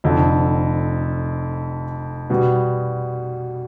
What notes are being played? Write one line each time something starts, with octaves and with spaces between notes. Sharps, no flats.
F1 F2 D3
B2 G3 B3